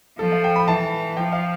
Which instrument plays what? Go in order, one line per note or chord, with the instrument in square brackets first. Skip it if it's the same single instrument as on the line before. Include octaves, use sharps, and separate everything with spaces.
[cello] F3 [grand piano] A4
[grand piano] F5
G5
B5
[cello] E3 [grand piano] A5
[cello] F3 [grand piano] G5
[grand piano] F5